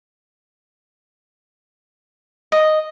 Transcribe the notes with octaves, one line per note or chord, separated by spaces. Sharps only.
D#5